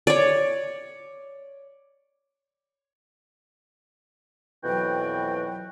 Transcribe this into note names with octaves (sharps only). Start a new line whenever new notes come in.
C#5 D5
F2 B2 E3 F#3 F#4 G5